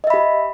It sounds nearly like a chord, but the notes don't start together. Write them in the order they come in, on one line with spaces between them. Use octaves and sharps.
D#5 E5 B5 G4